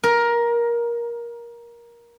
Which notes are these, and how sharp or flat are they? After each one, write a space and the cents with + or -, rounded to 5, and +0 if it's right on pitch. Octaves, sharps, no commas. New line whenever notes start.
A#4 +15